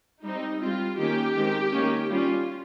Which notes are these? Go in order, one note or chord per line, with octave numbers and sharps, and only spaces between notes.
G3 C4 D#4
G3 C4 F4
D#3 A#3 C#4 G4
D#3 G#3 C4
D#3 A#3 C#4
G3 C#4 F4